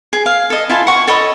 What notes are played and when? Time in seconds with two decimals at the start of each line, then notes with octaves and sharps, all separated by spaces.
0.13 G#4
0.26 F5
0.50 A4 D#5
0.70 E4 F4 G#5 A5
0.87 F#5 C#6
1.07 A4 C#5 D#5 B5